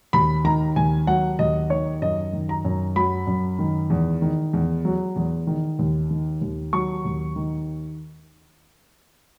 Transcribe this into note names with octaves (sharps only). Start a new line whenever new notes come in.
D#2 B5
D#3 A#5
D#2 G#5
F#3 F#5
D#2 D#5
D#3 C#5
F#2 D#5
D#3
A#5
F#2
F#3 B5
F#2
D#3
E2
D#3
E2
F#3
E2
D#3
D#2
D#3
D#2
F#3 C#6
D#2
D#3